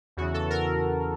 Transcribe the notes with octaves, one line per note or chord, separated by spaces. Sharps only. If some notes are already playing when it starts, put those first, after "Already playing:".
E2 C#3 E3 F#4
A4
A#4